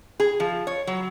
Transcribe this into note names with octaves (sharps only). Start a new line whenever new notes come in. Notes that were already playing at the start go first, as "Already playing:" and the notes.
G#4
F3
C#5
F#3